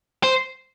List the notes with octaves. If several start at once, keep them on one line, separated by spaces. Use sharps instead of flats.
C5